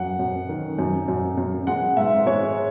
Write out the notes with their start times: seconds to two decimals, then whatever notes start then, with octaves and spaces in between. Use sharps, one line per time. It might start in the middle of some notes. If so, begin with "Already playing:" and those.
Already playing: F#2 F#5
0.19 F#2
0.49 D#3
0.79 F#2
1.08 F#2
1.38 F#2
1.67 G#3 F#5
1.97 G#2 E5
2.26 G#3 C#5